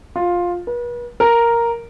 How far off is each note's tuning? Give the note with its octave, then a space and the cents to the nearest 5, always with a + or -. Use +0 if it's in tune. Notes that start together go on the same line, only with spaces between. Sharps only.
F4 +10
B4 -40
A#4 +0